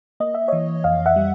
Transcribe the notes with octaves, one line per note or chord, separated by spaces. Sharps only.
A#3 D#5
E5
E3 C#5 D#5
F2 D#5 F5
E5 F#5
G3